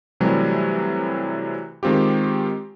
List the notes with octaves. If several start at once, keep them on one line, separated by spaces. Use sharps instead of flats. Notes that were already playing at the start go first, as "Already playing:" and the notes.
C3 E3 F#3 G3 A3
D#3 G#3 C4 F4 G4